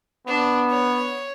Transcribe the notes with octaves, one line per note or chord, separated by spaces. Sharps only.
B3 D4
C#5